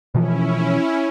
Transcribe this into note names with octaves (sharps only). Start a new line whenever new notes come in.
B2 E3 F3 C#4 E4